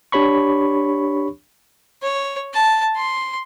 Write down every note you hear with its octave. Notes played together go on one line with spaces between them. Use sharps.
D4 G4 C#5 B5 C#6
C#5
A5
C6